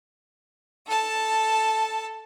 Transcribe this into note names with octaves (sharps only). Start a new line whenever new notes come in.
A4 A5